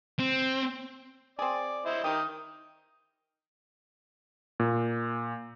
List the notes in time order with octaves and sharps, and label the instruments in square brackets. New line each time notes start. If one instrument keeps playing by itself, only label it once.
[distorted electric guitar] C4
[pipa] C4 G#4 [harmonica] D5
[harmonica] E4 C5 D#5
[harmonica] D#3 D#6 [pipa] D#4 G4
[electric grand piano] A#2